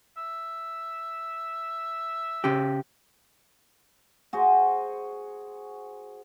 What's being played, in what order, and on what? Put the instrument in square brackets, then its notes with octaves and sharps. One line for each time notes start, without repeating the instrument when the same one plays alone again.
[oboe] E5
[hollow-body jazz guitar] C#3 G4
[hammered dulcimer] F#4 G#4 C5